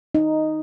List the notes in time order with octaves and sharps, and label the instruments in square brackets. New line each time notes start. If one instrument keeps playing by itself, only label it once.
[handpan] D#4